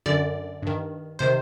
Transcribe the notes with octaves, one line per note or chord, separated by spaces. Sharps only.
F#2 D3 D5
G2 D#3
C3 D#3 C5